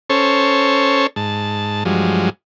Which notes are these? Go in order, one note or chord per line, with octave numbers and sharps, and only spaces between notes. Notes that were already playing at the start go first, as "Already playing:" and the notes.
C#4 A4 C5 C#5
G#2 A5
G2 F3 F#3 G#3